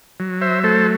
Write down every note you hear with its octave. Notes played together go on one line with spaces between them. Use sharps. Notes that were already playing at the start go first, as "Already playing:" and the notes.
F#3
C5 E5
A3 A4 C5